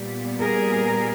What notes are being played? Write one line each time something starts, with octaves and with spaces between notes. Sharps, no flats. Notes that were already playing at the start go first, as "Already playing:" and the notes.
Already playing: A#2 G3 B3
G#4 A#4